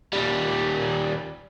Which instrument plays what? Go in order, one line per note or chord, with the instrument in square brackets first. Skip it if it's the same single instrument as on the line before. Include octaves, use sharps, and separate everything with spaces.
[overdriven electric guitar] D#2 G3